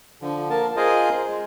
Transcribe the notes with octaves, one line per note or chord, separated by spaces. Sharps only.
D3 F3
A#3 A#4 A5
F4 G#4 A#4 C5 D#5
G#3